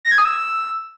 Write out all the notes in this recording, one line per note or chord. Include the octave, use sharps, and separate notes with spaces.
A#6
G#6
D#6
E6